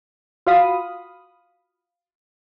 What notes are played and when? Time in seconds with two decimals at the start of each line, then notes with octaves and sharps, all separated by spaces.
0.47 F4 F#4 F5 B5 D#6